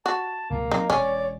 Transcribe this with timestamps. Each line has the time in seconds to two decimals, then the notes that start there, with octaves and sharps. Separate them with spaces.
0.06 F#4 A5
0.50 C#2 B2 G3 A#3
0.71 F#3 C4 D#4
0.90 E1 C#4 C#5 D5